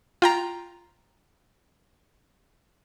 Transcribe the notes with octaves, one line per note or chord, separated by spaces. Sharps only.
F4 G5 A#5